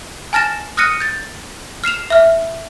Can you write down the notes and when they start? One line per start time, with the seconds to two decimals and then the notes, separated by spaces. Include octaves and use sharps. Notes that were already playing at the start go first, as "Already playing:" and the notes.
0.33 G#5 A5 F6 A6 A#6 E7
0.77 D#6 F6 F#6 A#6 C#7 D#7
1.00 G6 A6
1.84 F6 C7 E7 F7
2.10 E5 F6